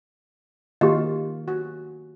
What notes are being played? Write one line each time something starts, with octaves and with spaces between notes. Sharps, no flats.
D#3 A#3 F4 G4 D#5
F#4